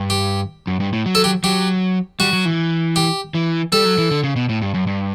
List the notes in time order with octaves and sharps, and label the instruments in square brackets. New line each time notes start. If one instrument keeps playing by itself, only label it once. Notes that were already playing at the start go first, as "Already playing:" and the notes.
Already playing: [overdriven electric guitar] G2
[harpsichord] G4
[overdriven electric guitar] F#2
G2
A2
F#3
[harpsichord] A4
G4
[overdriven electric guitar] F#3 [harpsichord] G4
[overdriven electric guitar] G3 [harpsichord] F#4
[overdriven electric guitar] F#3
E3
[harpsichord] G4
[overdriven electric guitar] E3
[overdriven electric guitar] G3 [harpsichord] A4
[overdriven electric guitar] F#3
E3
D3
C#3
B2
A2
G2
F#2
G2